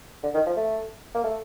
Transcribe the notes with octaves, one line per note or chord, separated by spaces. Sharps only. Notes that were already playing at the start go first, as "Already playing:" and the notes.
D3
D#3
F3
A3
A#3
A3